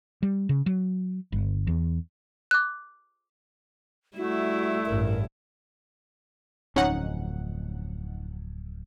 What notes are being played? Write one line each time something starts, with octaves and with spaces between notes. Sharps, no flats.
G3
C#3
F#3
G1
E2
D6 F#6
G3 A3 E4 F#4
A1 G2 A#4
D1 F2 C#4 D#4 F#5